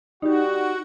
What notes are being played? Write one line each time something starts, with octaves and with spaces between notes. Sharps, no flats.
G3 D#4 F#4 G4